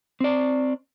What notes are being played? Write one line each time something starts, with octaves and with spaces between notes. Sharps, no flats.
C4 D5